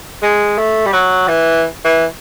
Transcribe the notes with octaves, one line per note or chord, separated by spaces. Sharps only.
G#3
A3
G3
F#3
E3
E3